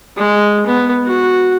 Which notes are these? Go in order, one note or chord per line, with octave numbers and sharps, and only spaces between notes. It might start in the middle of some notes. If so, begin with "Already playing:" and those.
G#3
B3
F#4